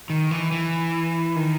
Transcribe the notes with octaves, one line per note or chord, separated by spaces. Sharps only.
D#3
E3
E3
D#3